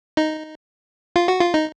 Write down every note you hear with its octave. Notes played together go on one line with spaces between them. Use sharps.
D#4
F4
F#4
F4
D#4